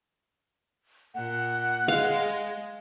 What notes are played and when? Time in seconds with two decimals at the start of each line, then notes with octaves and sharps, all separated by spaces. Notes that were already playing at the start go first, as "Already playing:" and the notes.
1.15 A#2 F#5
1.88 G#3 F5